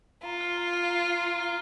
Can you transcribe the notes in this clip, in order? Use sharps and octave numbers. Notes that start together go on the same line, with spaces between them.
F4 A#5
F6 C7 G7
A#5
F6 C7 G7
A#5
F6 C7 G7
A#5
F6 C7 G7